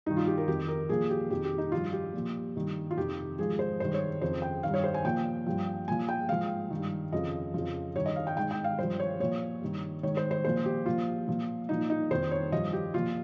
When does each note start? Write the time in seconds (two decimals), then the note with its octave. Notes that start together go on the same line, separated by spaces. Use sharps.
0.06 G2 D#3 D#4
0.17 F4
0.27 G4
0.38 A#4
0.48 F2 D#3 G4
0.68 A#4
0.89 A#2 F3 G#4
1.10 G4
1.30 F2 D#3 G4
1.44 G4
1.58 D#4
1.72 G2 F3 F4
1.93 G4
2.14 A#2 F3
2.55 G2 D#3
2.91 F4
2.97 F2 C3 D#3 G4
3.38 G#2 F3 G#4
3.59 C5
3.80 G2 D#3 C5
3.94 C#5
4.21 F2 C#3 F3 C5
4.42 G5
4.63 D#3 F5
4.68 G2
4.74 C#5
4.84 C5
4.94 G#5
5.05 A#2 F3 G5
5.46 G2 F3
5.88 A#2 F3 G#5
6.09 G5
6.29 G#2 F3 F5
6.70 D#3
6.76 G2
7.12 F2 C#3 F3 D#5
7.54 F2 C#3 F3
7.95 G2 D#3 C#5
8.06 D#5
8.16 F5
8.27 G5
8.37 G#2 D#3 G5
8.51 G5
8.64 F5
8.79 G2 F3 C5
9.00 C#5
9.20 A#2 F3 C#5
9.61 G2 D#3
10.03 G#2 D#3 C#5
10.17 C5
10.31 C5
10.45 A#2 F3 C5
10.65 G4
10.86 A#2 F3 F4
11.28 A#2 F3
11.69 A#2 F3 D#4
11.90 D#4
12.11 F2 D#3 C5
12.31 C#5
12.52 G2 F3 D#5
12.73 G4
12.94 A#2 F3 F4